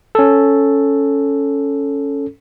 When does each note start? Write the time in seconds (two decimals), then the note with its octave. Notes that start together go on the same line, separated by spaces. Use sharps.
0.15 C#4 A4